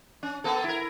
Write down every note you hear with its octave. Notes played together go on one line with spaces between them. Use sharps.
C#4
A#3 B3 A4
E4 A#4